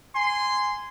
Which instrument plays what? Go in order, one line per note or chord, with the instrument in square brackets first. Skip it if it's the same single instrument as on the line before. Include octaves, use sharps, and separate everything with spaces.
[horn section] G#5 C6